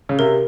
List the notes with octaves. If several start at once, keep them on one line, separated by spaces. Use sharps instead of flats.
C#3
C3 A#4